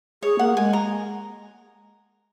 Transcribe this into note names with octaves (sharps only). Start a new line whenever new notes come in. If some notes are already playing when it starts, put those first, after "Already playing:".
G#4 C#5
A#3 F#5
G#3 G#5
A#5